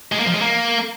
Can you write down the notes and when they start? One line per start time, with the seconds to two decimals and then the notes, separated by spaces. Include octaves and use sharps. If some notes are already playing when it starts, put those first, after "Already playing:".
0.12 G#3
0.19 A#3
0.27 F3
0.34 G#3
0.41 A#3